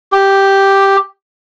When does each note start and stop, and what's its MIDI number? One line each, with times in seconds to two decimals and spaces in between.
0.12 0.97 67